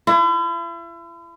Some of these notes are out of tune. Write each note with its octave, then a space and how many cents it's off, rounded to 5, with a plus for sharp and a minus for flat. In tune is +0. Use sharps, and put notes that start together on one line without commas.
E4 +40